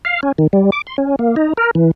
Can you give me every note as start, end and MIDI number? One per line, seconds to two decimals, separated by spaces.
0.05 0.20 77
0.23 0.32 61
0.38 0.47 51
0.53 0.70 55
0.72 0.82 86
0.87 0.96 84
0.98 1.16 61
1.19 1.35 58
1.36 1.53 63
1.57 1.71 70
1.75 1.91 52